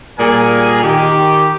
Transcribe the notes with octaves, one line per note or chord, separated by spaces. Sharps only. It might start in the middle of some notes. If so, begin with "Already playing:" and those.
A#2 G3 G#4 A#4 G#5
D#3 G4